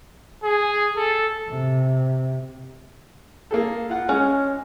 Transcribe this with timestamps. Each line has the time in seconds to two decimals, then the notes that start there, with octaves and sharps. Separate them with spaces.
0.43 G#4
0.96 A4
1.49 C3
3.51 A#3 G#4 A4
3.89 F4 F#5
4.09 G#3 C#4